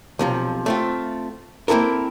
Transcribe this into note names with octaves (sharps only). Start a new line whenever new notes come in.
B1 C3 F3
A3 C4 F4
A#3 C4 E4 A4 A#4